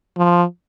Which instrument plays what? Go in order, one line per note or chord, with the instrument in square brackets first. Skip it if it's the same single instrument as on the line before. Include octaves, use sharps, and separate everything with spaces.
[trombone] F3